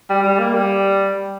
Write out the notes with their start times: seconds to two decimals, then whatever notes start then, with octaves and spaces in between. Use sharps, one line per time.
0.10 G3
0.24 G3
0.39 A#3
0.54 G3